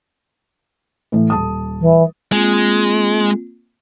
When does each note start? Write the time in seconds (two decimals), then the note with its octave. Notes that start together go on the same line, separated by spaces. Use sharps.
1.12 A2 E3
1.30 D#1 A5 D#6
1.81 E3
2.32 G#3 A#3 C4 F4